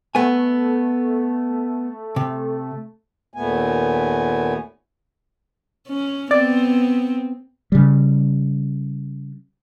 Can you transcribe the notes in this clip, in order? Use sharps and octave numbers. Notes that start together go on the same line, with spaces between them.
A3 B3 G#5
C3
D#2 A#2 A3 B3 G#5
C#4
B3 C4 D5
C#3 G3